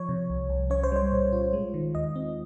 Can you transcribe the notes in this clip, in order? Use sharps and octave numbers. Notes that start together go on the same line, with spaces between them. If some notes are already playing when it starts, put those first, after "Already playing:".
Already playing: F3 C#5
C3
C2
C2
C#4 C#5
C5
G3 C#5
A#2
F4
G#3
D#3
D#2 D#5
C4